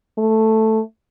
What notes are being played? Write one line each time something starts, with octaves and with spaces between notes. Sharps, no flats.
A3